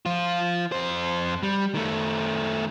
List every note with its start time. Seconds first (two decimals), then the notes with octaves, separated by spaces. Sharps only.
0.06 F3 F4
0.72 F2 C5
1.43 G3
1.75 D#3 A3